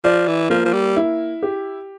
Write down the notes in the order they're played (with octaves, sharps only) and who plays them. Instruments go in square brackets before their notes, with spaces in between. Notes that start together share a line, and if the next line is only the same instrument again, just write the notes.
[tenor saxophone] F3 [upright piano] D5
[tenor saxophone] E3
[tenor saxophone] F3 [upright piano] A#3
[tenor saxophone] F3
G3
[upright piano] E4
G4